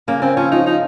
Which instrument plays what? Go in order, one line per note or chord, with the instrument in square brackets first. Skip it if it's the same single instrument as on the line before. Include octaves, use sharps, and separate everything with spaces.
[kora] C#3 [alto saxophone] A#3
[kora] C#3 [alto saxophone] C4
[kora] F3 [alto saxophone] C#4
[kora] F3 [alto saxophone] D#4
[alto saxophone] D#4